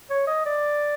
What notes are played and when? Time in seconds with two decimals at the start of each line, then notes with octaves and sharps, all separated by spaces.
0.10 C#5
0.27 D#5
0.46 D5